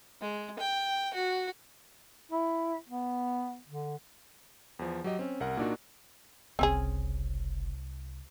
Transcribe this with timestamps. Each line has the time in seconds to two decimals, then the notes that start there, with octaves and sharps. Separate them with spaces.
0.21 G#3
0.59 G5
1.14 F#4
2.32 E4
2.89 B3
3.68 D3
4.79 E2 F3
5.04 F#3 G4 D#5
5.19 C4 C#4
5.40 C2 A#4 F#5
5.57 A#2 A#3 D4 D#4 F#4
6.59 F#1 C2 C4 C#4 G#4